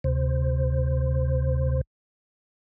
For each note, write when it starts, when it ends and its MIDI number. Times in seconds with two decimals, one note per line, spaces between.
0.04 1.81 38
0.04 1.81 48
0.04 1.81 72